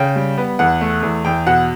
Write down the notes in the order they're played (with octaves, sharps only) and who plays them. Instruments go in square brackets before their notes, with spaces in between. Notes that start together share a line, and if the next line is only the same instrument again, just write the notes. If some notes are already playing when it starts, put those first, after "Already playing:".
Already playing: [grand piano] C#3 G5
G3
B3
E2 F#5
A3
E2
E2 G5
B2 F#5